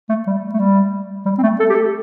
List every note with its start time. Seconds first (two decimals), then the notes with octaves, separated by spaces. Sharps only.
0.10 A3
0.27 G3
0.54 A3
0.60 G3
1.26 G3
1.38 C4
1.43 A3
1.60 A4
1.70 G4
1.75 A4